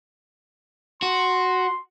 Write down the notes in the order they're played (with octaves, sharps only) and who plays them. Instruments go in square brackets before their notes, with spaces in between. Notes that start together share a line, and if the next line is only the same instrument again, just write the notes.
[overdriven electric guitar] F#4 [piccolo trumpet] C6